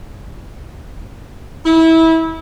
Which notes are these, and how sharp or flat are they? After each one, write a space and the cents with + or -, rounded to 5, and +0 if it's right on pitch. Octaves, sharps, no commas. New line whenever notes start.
E4 -25